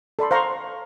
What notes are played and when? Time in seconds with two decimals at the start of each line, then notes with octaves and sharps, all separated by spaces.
0.19 A4 D5 B5 C6
0.31 C5 F5 A#5 C6 C#6